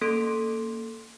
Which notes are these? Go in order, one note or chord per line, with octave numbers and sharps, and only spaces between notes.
A#3 C#4 A4 C6 D7